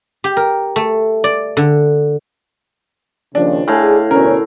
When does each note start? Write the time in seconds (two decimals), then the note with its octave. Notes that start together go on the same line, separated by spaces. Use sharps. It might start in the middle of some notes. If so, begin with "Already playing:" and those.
0.24 G4
0.37 A#4
0.76 A3
1.24 D5
1.57 D3
3.35 D#2 C#3 F3 D4
3.68 A2 G#4 F5
4.11 D2 B2 C#4 A#4